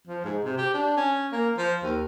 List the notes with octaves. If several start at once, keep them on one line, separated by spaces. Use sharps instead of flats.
F3
G#2
C3
G4
D4
C#4
A#3
F3
D#2